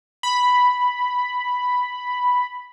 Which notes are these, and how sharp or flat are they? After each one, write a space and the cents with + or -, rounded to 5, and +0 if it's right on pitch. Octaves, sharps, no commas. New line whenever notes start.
B5 +0